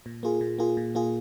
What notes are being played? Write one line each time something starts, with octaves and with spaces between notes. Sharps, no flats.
A#2
A#3 F4 G#4
A#2
A#3 F4 G#4
A#2
A#3 F4 G#4